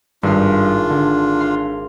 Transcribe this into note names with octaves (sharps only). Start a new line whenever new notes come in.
G#1 G2 D4 F4 F5
D3
F5 C6